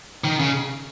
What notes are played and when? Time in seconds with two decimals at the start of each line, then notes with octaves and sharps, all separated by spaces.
0.24 D#3
0.39 C#3